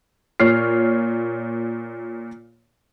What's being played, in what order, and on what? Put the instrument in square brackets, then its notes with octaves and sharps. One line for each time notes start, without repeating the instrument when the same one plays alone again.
[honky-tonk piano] A#2 C#5 F6 C7